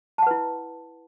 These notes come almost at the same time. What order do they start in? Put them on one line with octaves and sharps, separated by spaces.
A5 F#5 B4 E4